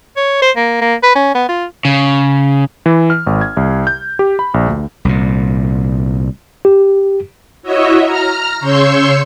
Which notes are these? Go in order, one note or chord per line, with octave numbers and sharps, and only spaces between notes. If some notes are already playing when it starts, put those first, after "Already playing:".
C#5
C5
A#3
A#3
B4
C#4
B3
F4
C#3
E3
F6
G#1
G#6
C2
G6
G4
B5
A#1
D2
C2 A#2
G4
E4 F#4 C#5 D#5 E5
A#5 F6
C#3 C#5 C6 C#6 E6 G6